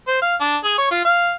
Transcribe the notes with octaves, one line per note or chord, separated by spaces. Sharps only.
C5
F5
D4
G#4
C#5
F4
F5